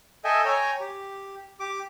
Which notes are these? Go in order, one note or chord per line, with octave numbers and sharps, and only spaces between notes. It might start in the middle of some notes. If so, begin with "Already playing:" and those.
A4 D#5 E5 G5 G#5
C#5 G5 G#5 A#5
G4
G4 D6